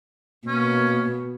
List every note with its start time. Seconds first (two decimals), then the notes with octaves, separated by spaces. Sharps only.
0.47 B2 A#3 C#4